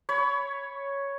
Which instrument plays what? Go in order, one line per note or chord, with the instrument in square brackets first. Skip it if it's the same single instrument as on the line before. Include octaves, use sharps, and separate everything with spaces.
[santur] C#5 B5